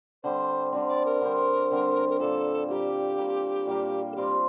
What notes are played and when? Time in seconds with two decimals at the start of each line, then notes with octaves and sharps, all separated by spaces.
0.23 D3 G3 C4 C5
0.72 D3 G3 C4
0.88 D5
1.06 A#4
1.21 D3 G3 C4
1.71 D3 G3 C4
2.09 A#4
2.19 A#2 G3 A#3 A4
2.69 A#2 G3 A#3 G4
3.18 A#2 G3 A#3
3.67 A#2 G3 A#3
4.12 A4
4.16 G3 C4 F4 G4